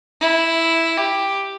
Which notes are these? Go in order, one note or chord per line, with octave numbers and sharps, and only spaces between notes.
E4
G4